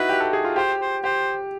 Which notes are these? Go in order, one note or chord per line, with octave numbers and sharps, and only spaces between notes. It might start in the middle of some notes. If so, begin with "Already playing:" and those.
Already playing: D#4 E4 F#4 B4
G4
A4
G#4
F4
G4 C5
C5
G4 C5